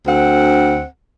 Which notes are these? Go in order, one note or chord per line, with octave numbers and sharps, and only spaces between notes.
D2 C4 F#5